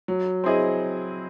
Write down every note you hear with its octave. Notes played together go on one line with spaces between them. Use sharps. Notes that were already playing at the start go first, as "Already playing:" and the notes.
F#3
C4 E4 G#4 D#5